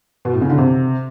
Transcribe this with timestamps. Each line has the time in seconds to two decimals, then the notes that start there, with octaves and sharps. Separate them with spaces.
0.25 B2
0.33 A2
0.41 C#3
0.50 D3
0.58 C3